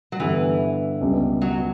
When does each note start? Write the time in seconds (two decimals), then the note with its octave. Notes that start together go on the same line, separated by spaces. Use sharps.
0.12 F#3
0.20 G2 D3 E3 G3 B3
1.01 C#2 B2 G3
1.42 F#3